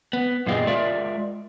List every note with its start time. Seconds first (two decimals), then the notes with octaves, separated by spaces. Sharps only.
0.13 B3
0.47 F#2 A#2 F4 G4 G#4 D#5
0.67 G#3 F4 A#4 D5 E5